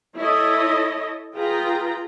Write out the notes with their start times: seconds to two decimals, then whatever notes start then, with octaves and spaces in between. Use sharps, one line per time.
0.16 E4 A4 C#5 D#5
1.35 F4 G#4 B4 G5 A#5